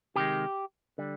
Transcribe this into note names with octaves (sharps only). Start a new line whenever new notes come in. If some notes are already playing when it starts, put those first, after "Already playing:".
C3 D#3 G#3 G4
D3 G3